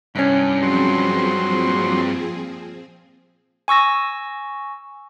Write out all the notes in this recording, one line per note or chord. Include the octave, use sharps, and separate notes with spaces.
C2 G2 C#4
F3 F#3 C4 G#4 C6
A#2
G#5 C#6 E6 A#6